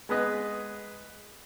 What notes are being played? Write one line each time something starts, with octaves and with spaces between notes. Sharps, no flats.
G#3 B3 G#4 B4 D#5